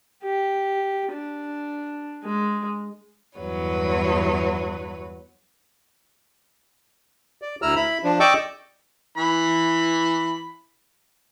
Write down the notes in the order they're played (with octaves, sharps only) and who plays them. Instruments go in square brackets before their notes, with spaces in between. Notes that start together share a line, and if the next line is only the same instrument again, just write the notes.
[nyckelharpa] G4
D4
G#3
[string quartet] E2 G2 F#3 B4 C#5
[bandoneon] D5
D2 E4 A#5 E6 F6
E4 B5
F3 D4
D5 D#5 G5 C#6 D6 E6
[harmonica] E3 B5